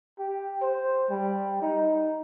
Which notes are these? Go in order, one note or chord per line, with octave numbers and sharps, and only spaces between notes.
G4
C5
G3
D#4